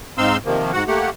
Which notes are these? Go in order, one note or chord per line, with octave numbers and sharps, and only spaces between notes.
G#2 C4 D#4 F5 C6 E6
C3 D#3 F3 A#3
G#2 F#4 F#5
A3 A#3 G4 F#5